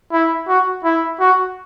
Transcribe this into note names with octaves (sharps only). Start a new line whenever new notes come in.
E4
F#4
E4
F#4